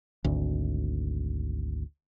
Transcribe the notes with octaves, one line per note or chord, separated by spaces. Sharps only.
G#1 D2